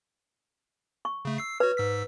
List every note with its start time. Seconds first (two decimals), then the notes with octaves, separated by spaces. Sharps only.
1.05 C#6
1.25 C#3 A3
1.38 E6 C7
1.60 F#4 B4 C#5
1.77 G#2 E6 B6